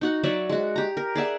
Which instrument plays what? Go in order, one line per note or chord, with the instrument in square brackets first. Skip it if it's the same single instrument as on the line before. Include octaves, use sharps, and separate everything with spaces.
[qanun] D#4 F#4 F#5
F#3 D5 E5
G#3 F#4
G4 A#5
A#4
G#4 D5 E5 F#5